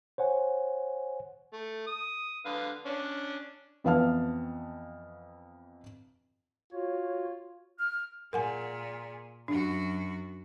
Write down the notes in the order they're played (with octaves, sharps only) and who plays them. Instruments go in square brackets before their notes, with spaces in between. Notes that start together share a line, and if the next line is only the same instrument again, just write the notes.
[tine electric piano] C5 C#5 F#5 G#5
[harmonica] A3
D#6
D3 B4 F5
C#4 D4
[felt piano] F2 E3 B3 F5 A5 F6
[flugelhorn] F4 [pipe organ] F#4 C#5
[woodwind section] F6
[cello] A#2 G#4 [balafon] A#4 F#5 G#5
[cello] F#2 F#4 [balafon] D4